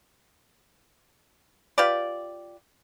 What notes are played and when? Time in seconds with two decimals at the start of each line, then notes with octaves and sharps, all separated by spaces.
1.78 F4 G4 B4 D5